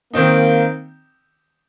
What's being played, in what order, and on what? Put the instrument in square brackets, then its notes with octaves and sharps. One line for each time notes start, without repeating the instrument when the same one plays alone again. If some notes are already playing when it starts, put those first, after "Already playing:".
[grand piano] D#3 C4 D#4 [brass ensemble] A#3